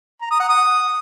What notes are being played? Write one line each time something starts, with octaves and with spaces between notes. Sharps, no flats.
A#5
D#6
F#5
D#6